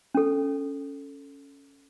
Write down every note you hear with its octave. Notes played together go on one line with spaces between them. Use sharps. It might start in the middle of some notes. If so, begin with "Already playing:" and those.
C#4 A4